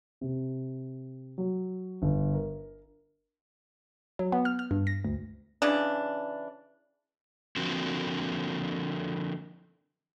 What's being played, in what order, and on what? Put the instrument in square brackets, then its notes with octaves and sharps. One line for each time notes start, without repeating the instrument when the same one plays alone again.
[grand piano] C3
F#3
G1
A#4
[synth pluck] F#3
B3
F6
F6
G2
A#6
D2
[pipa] C#3 E3 D4
[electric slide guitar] D3 F3 A#3 C4 F#4